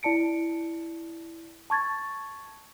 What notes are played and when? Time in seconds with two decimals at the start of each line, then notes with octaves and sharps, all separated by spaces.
0.03 E4 D5 A5 C#7 D7
1.70 A5 C#6 G#6 A6